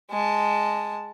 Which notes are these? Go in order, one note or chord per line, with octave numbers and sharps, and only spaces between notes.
G#3 A5